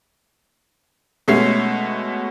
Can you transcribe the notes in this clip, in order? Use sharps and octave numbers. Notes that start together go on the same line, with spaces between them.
B2 G#3 A3 C#4 C7